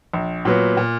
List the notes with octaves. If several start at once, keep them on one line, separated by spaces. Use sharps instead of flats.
A#1
A#2 F#3 B3
A#2